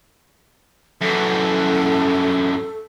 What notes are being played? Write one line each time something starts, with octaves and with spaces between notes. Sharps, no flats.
F#2 E3 A4